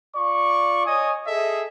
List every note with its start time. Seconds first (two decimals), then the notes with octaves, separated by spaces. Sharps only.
0.15 F4 D5 C#6
0.87 C#5 D#5 G#5 D#6
1.27 G#4 A4 D#5 E5